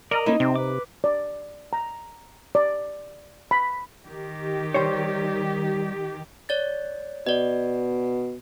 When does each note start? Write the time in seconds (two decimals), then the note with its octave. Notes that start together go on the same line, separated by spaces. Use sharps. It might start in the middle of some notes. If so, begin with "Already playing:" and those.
0.11 A#4 D5 D#5 A#5
0.26 A#3 C#4 D#4 E4
0.40 C3 C4
0.56 B4 D6
1.04 D5
1.73 A#5
2.55 D5
3.51 B5
4.05 D#3 G4
4.74 G3 C5 C#5
6.49 C#5 D5 A6
7.27 B2 D5 D#5